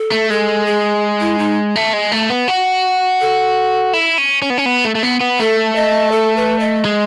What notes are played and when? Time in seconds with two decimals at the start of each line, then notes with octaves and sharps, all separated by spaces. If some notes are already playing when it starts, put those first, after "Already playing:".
Already playing: A4
0.12 A3
0.30 G#3 A4
0.66 G#4
1.20 E4
1.39 D#4
1.76 A3
1.93 G#3
2.12 A3
2.30 B3
2.48 F#4
3.20 A4
3.93 E4
4.18 C#4
4.42 C#4
4.50 B3
4.58 C#4
4.66 B3
4.85 A3
4.95 A3
5.03 B3
5.21 B3
5.39 A3 A4
5.75 D#5
6.12 A4
6.36 B4
6.60 D#5
6.85 G#3